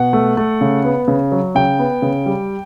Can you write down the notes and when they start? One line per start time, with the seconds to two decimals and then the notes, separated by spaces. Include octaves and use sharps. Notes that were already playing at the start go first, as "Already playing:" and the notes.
Already playing: B2 F#5
0.13 A3
0.37 A3
0.61 C#3
0.84 B3
1.08 C#3
1.32 F#3
1.55 C#3 G5
1.79 B3
2.02 C#3
2.26 G3